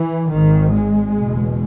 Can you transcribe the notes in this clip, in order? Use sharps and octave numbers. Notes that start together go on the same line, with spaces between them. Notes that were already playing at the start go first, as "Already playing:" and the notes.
Already playing: E3
G#1 G#2 D#3
G#3
F#1 E2 B2